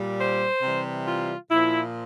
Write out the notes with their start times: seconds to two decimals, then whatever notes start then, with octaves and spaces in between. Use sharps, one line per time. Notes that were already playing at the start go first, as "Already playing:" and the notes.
Already playing: A#2 G3
0.19 C5
0.62 C3 E3 G3
1.07 F4
1.50 A#2 F3 E4